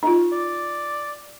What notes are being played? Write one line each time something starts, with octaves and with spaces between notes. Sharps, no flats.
D#4 F4
D5